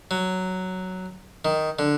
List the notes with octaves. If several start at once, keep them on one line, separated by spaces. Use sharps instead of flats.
F#3
D#3
D3